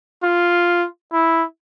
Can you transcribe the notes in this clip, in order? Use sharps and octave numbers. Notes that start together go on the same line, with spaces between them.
F4
E4